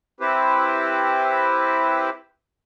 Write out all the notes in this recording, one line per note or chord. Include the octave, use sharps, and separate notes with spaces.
C4 E4 G4 B4 C5